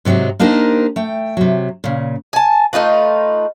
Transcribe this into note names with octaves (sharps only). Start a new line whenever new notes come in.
G#2 C3 F#3 G#3 C4
A#3 D4 D#4 G4 A#4 C5
A3 G5
C3 F#3
A#2 C#3
G#5 A5
A3 D#4 F4 B4